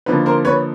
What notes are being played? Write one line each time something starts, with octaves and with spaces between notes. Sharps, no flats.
D3 F3 A#3 D#4 B4
A#4 C5
B4 C#5